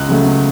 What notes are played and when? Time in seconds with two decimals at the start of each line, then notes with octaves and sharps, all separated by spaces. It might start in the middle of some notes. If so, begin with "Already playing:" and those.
Already playing: C#2 F#6
0.09 C#3 F#3 A3
0.26 C#2